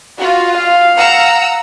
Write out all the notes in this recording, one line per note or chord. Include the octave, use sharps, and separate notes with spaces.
F4 F#4
F5
F#5 A#5 E6